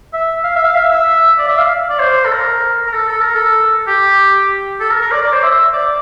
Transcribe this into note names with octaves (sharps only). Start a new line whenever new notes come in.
E5
F5
E5
F5
E5
E5
D5
E5
F5
D5
C5
A4
A#4
A#4
A4
A4
A#4
A4
G4
A4
A#4
A#4
D5
D5
C5
E5
D5